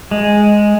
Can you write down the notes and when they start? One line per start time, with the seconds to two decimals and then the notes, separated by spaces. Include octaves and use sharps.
0.11 G#3